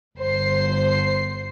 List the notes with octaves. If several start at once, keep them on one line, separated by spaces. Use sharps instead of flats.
G1 C5 C7